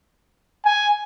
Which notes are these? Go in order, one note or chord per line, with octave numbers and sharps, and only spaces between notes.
G#5